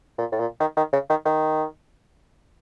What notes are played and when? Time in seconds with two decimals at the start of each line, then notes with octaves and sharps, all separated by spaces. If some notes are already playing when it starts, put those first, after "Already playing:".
0.18 A#2
0.32 A2
0.39 A#2
0.60 D#3
0.77 D#3
0.93 C#3
1.09 D#3
1.25 D#3